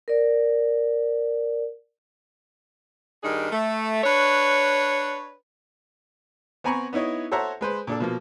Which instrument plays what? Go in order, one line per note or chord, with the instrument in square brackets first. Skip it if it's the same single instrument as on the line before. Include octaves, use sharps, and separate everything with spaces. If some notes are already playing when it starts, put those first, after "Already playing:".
[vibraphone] A#4 D5
[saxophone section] G2 D#3 D4 D#4 G#4
A3
D4 B4 C#5
[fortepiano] B3 C4 G#5 A#5 B5 C#6
B3 D#4 E4 C#5 D#5
A4 C5 C#5 E5 F#5 A#5
G#3 B4 C5
A#2 D4 A4
B2 F3 A#3